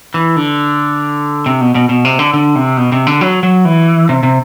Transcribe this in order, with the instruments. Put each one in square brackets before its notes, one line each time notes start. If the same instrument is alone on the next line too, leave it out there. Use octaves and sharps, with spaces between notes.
[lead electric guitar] E3
D3
C3
B2
B2
B2
C3
D3
D3
C3
B2
C3
D3
F#3
F#3
E3
C3
C3